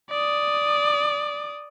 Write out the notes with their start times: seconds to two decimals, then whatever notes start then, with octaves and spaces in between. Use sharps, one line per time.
0.10 D5 D#6